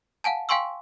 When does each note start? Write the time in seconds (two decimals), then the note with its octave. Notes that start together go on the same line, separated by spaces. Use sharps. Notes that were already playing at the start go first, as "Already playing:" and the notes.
0.24 F5 F#5 G#5 A5
0.49 F5 G5 G#5 C6 C#6 E6